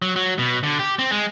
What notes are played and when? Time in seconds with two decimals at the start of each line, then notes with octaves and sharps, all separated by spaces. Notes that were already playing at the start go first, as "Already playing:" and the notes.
0.02 F#3
0.16 F#3
0.38 B2
0.63 D3
0.79 G4
0.99 C4
1.12 G#3